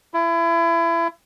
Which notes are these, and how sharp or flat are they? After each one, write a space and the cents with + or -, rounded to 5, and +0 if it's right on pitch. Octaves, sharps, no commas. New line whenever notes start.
E4 +30